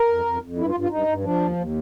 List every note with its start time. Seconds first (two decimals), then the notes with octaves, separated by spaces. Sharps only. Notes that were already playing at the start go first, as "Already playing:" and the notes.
Already playing: A#4
0.08 F2
0.25 F2
0.42 F2
0.57 G2 E4
0.68 F4
0.75 G2
0.80 F4
0.90 G2 D#4
1.07 G2
1.24 F3 D4
1.40 D#2
1.56 D#2